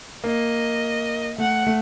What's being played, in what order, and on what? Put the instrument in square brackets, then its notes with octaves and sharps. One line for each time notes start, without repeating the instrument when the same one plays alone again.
[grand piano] A#3 [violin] D#5
[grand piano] A3 [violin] F#5
[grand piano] A3